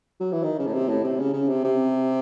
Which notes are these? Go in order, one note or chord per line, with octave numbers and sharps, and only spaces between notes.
F#3
E3
D#3
C#3
A2
C3
A2
C3
C#3
C#3
C3
C3